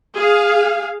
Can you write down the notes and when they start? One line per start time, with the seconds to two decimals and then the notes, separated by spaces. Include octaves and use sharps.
0.16 G#4 F5